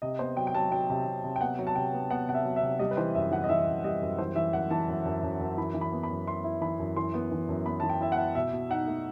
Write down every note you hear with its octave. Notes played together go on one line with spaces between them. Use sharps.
C3 D#5
B3 C5
F#3 G5
G5
F#3 A5
F#3 G5
C3
C3
C3
G5
B3 F#5
F#3
A5
C3 G5
B3
B3 F#5
C3 F#5
E5
F#3
E5
C3
G3 D#5
B4
E3 C5
F#2 E5
E3 F#5
D#5
E3 E5
F#2
G3 D#5
F#2
E3 C5
E3 E5
F#2 F#5
E3 A5
F#2
F#2
F#2
F#2
E3 B5
E3
B5
B3
B5
F#2
E4 C6
E4
E3 B5
F#2
E3 C6
B3
E3
F#2
B3 B5
E3 A5
G5
E4 E5
F#5
E4
B2 E5
B2
D#4 F#5
A3